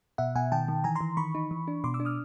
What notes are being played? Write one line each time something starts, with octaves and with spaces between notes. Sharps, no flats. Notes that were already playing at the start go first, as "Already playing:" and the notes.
B2 E5 F#5
B2 F#5 G#5
D#3 G5 A5
D#3
E3 G#5 A#5
A#5 C6
E3
D#3 B5 C#6
D#4
E3
D4
B2 C6 D6
D6 E6
D4
D#6 F6